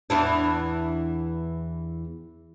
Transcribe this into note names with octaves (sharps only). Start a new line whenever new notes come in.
E2 E3 D4